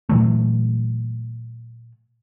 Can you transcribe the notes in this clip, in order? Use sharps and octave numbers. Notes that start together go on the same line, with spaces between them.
A#2 E3 F#3 A3